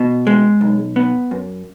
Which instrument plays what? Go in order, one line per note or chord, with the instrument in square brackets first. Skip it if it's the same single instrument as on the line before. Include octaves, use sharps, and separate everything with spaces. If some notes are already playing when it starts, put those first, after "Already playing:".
Already playing: [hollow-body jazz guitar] B2
G#3
B1
B3
F#2